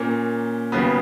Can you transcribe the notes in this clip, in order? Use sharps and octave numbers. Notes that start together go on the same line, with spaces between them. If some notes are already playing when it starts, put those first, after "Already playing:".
Already playing: A#2 A#3 C#4
D#2 C#3 F#3 B3